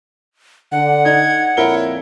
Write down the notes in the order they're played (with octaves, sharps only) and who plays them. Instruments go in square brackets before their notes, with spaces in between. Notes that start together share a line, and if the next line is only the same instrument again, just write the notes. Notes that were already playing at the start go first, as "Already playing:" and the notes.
[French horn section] D3 [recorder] F#5
[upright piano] D#4 [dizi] G#6
[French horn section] F2 A#2 C4 [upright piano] E4 A#4 G7 [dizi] C#5